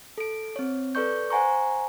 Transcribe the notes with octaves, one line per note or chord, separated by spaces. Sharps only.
A4 D7
C4 C#5
A4 B4 D5 C#6 G6
C5 F#5 G#5 A#5 C#6